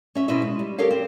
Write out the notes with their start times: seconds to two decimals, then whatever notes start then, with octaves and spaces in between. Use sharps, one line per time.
0.15 C#4 E5
0.28 B2 B3 C4 E4 D#5 E5
0.42 G#3
0.59 G3
0.78 G4 A4 A#4 C#5 F5
0.91 C4